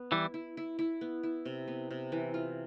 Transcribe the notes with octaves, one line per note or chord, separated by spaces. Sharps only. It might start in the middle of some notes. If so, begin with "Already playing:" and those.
Already playing: B3
E3 G3 E4
E4
E4
E4
B3
E4
C3
B3
C3
E3
F4